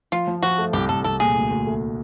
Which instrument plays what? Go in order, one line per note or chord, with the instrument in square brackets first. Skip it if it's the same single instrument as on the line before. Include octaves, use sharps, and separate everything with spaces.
[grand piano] F3 [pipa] F4
[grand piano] F3
[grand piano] F3 [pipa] F#4
[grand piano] A3
[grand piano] C2 [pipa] G4
[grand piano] C2 [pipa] A4
[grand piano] C2 [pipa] A4
[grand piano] A#2 [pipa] G#4
[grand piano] D2
D2
A3